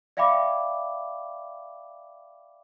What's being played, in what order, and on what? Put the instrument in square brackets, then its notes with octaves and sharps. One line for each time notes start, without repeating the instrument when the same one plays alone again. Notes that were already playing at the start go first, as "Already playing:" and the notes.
[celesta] D5 E5 F5 G5 B5 D6